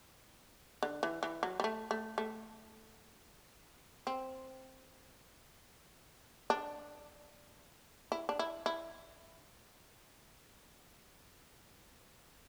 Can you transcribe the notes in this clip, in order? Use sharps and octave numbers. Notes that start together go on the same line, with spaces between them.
D3
E3
E3
F#3
G3
A3
A3
A3
C4
D4
E4
D4
E4
E4